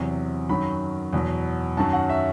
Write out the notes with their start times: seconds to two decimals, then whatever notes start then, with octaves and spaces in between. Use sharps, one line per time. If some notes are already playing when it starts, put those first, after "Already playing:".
Already playing: E2 C3 F#3
0.49 F#2 D#3 F#3 B5
1.13 E2 B2 F#3
1.77 F#2 D#3 F#3 A5
1.93 F#5
2.10 E5